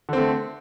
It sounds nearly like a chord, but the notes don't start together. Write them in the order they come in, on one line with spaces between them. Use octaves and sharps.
D3 C4 A3